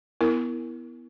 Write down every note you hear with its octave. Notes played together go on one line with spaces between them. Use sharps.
B3 E4 A#4